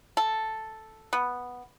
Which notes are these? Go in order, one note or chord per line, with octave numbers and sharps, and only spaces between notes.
A4
B3